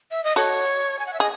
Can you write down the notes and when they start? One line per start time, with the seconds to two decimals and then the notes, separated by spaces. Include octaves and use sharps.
0.11 E5
0.24 D#5
0.36 F#4 A4 C#5
0.99 G#5
1.06 F#5
1.13 E5
1.20 G#4 D#5